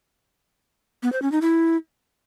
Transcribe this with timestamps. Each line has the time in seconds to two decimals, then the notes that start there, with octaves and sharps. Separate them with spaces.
1.03 B3
1.12 C5
1.22 C#4
1.32 D#4
1.42 E4